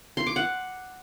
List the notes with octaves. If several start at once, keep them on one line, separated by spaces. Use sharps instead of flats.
C6
D6
F#5